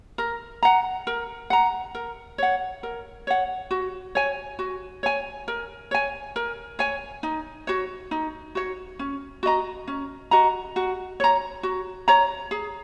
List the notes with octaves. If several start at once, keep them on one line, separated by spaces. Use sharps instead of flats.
A#4
F#5 A#5
A#4
F#5 A#5
A#4
C#5 F#5
A#4
C#5 F#5
F#4
C#5 G#5
F#4
C#5 G#5
A#4
C#5 G#5
A#4
C#5 G#5
D#4
F#4 C#5
D#4
F#4 C#5
C#4
F#4 D#5 A#5
C#4
F#4 D#5 A#5
F#4
C#5 A#5
F#4
C#5 A#5
G#4